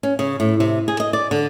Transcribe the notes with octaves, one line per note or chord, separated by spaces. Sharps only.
C#4
C#3
A2
C3
G#4
D#5
D5
D3